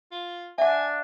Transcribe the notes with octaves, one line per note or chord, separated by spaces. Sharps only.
F4
D4 E5 F#5 G#5